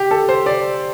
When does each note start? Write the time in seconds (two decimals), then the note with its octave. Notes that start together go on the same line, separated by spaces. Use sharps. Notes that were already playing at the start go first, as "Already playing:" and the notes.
Already playing: G4
0.11 A4
0.29 C5
0.46 D5